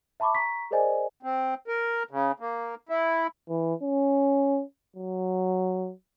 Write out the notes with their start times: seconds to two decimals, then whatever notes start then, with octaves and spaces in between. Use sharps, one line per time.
0.20 E5 A5 B5 C#6 D6
0.35 A#5 C#6 B6
0.71 G#4 A#4 C5 D5 D#5 G#5
1.23 C4
1.68 A#4
2.11 C#3
2.40 A#3
2.89 E4
3.49 E3
3.83 C#4
4.96 F#3